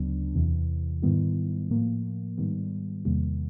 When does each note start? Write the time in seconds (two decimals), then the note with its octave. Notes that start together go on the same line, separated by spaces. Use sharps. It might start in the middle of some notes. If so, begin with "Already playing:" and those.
Already playing: D2 C#3 F#3 B3 D4
0.35 E2 C3 E3
1.02 G#2 D#3 G3 B3 E4
1.70 A2 F3 A#3
2.38 G#2 D#3 G3 B3
3.05 E2 C3 D#3 G3 A#3